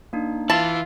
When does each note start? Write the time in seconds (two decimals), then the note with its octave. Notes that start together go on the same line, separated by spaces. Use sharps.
0.13 A#3 D4 D#4
0.50 E3 F4 E5 A5